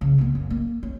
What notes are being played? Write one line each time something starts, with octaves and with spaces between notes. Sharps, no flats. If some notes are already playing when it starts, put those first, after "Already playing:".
C#3 F#3
A#3 B3
F#2
A#3
C#4